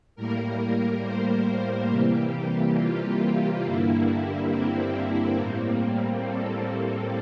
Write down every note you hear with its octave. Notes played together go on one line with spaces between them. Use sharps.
A2 G3 A#3 A#4
C5
A#4
C3 E3 G3 A#3 G4
F4
G2 D3 G3 A#3 E4
C4
A2 G3 A#3
A#3
A4
A4